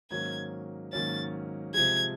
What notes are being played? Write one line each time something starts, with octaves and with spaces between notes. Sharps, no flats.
G#2 D#3 F#3 A#3 C#4 G#6
G#2 D#3 F#3 A#3 C#4 A6
C3 F3 G#3 G#6